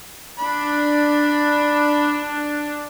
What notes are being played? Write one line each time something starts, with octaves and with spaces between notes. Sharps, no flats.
D4 B5